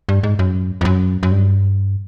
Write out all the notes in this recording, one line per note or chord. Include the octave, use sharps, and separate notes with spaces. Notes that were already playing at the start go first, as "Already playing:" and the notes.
G2
G#2
F#2
F2
F#2
F#2
G2